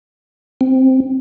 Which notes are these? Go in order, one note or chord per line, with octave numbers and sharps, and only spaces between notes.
C4